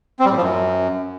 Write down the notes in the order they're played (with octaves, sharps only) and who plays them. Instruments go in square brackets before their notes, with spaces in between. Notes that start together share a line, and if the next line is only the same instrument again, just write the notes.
[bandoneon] C4
G3
A2
F3
F#2